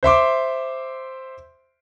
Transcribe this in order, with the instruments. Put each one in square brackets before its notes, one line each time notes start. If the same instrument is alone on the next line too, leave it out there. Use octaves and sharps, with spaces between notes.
[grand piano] C5 E5 C6 D6